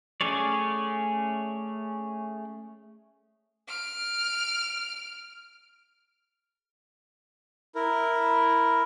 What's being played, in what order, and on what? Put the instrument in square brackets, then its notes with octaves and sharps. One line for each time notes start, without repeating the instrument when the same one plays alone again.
[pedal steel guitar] A3 C#4 G#4 C#5 D5
[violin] F6 D7
[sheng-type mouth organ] E4 A#4